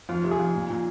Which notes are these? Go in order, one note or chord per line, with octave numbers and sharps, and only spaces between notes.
F2 F4
C3
G#4
F2
A#2
A#2